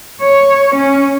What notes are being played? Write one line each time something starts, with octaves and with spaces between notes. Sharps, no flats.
C#5
C#4